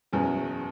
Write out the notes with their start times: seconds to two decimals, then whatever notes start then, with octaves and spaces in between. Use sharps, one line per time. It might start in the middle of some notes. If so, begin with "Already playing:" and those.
0.13 F#1 E2 B2 G#3 C#4